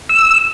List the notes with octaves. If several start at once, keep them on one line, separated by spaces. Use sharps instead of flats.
E6